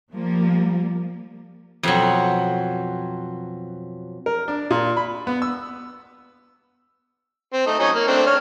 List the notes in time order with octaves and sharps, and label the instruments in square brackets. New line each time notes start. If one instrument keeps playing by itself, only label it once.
[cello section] F3 G3 A#3
[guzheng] F2 B2 F#3
[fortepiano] A#4
D4
A#2
B5
B3
E6
[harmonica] C4
A3 D#4
F#3 C#4 D#4
A#3
A3 C4 D4
C#5 F6